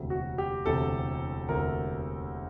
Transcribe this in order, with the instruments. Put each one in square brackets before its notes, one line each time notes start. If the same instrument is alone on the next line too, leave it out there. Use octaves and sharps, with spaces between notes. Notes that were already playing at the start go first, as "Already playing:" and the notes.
Already playing: [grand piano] E1 D2 C3
F#4
G4
E1 D2 C3 A4
E1 D2 C3 A#4